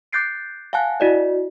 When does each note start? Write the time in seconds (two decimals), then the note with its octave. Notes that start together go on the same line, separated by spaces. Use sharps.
0.13 D6 F#6 G6 A6 C7 D7
0.73 F5 F#5 G#5 A5 F#6
1.00 E4 F#4 D5 D#5